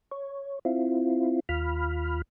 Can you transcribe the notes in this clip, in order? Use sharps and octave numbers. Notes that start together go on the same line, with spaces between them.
C#5
C4 E4 F4
D#2 F4 B5 F6